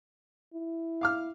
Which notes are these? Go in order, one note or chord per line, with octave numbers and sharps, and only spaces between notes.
E4
F5 D6 F6